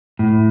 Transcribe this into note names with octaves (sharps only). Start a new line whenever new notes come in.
A2